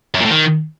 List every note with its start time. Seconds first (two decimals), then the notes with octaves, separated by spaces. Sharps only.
0.15 F#2
0.20 A#2
0.25 A2
0.31 D#3